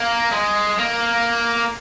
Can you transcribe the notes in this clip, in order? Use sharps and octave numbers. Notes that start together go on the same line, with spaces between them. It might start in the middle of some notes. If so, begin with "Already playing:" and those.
Already playing: A#3
G#3
A#3